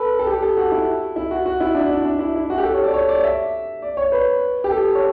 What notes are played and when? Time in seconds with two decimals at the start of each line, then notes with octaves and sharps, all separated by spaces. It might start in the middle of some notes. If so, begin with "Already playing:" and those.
Already playing: A4 B4
0.19 A4
0.27 G4
0.42 A4
0.57 F#4
0.72 E4
1.16 E4
1.31 F#4
1.46 F#4
1.60 E4
1.75 D4
1.90 E4
2.05 D4
2.19 E4
2.35 E4
2.50 F#4
2.58 G4
2.64 A4
2.74 C#5
2.84 D5
2.94 C#5
3.09 D5
3.23 E5
3.82 D5
3.97 C#5
4.12 B4
4.64 G4
4.71 A4
4.95 C#5